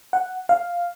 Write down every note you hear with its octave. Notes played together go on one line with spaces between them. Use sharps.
F#5
F5